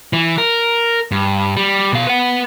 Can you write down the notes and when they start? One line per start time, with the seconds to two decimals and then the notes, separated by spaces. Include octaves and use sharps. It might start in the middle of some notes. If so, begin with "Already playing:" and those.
0.13 E3
0.38 A#4
1.12 G2
1.56 G3
1.92 B2 F5
2.07 B4 F#5